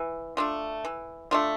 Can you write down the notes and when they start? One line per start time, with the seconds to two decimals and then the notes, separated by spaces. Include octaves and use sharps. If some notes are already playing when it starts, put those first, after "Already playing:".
Already playing: E3
0.37 A3 D4 F4
0.85 E3
1.31 A3 D4 F4